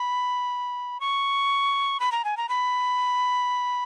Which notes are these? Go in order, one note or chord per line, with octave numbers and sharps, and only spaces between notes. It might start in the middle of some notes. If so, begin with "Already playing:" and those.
Already playing: B5
C#6
B5
A#5
G#5
A#5
B5